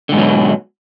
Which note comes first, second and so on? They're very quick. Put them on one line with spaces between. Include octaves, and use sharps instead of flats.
D3 G#2 B2 F#3